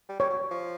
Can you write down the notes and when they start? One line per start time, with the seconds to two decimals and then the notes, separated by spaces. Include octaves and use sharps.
0.09 G3
0.20 G3 C#5
0.30 F#3
0.51 F3